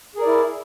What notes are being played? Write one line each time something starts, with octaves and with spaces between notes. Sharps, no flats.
E4 G#4 A#4 D5